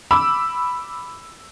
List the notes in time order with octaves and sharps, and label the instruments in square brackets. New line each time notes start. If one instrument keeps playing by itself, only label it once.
[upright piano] B5 D6 E6